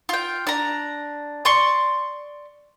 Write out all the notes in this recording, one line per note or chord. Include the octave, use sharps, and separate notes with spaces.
F4 G5
D4 A#5
D5 C6 C#6